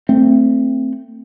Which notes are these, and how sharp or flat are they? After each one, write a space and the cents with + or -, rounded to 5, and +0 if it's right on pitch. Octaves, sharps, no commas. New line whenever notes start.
A3 +25 C4 +0